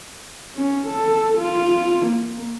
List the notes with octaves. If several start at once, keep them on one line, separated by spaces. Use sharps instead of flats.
C#4
A4
F4
A#3